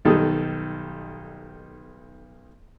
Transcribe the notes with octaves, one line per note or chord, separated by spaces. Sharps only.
B1 D#3 G3 A4 D#6